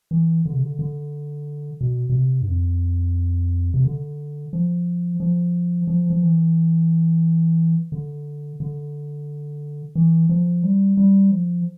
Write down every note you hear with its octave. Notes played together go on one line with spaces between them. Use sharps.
E3
D3
C3
D3
D3
B2
B2
C3
G2
F2
C3
D3
F3
F3
F3
F3
E3
D3
D3
E3
F3
G3
G3
F3